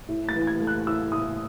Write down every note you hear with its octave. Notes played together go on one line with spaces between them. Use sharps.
A2
A6
E3
G#6
A3
F#6
A2 E6
A2 D#6